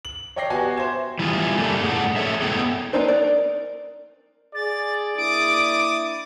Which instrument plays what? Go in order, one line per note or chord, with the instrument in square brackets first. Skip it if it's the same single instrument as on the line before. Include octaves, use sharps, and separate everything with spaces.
[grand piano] F#7
C#5 D5 G5 D6 A#6 C7
B3 F#4 G4 G#5 G#6
C5 E5 G#6 E7
[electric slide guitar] E3 G3 E4 F4 G#4
G3 A3 A#3 D4 A4
A2 D4 G#4 F#5
G#4 A4 C#5 E5
A3 B3 E4 G#4 A4 G5
[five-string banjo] A#3 B3 D4 D#4 C5
A#4 D5
[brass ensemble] G#4 [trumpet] D5 [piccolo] A6
[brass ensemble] A#3 D4 E4 [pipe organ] D6 D#6 [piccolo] D7